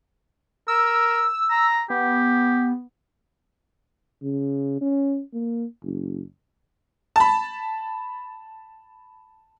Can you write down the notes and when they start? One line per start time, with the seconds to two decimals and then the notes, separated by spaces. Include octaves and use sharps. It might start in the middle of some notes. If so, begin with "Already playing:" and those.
0.68 A#4 E6
1.50 A#5
1.90 B3 G4
4.23 C#3
4.81 C#4
5.34 A#3
5.84 F#1
7.16 A5 B5